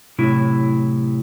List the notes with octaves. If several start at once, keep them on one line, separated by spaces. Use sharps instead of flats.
A2 C3 F#3 E4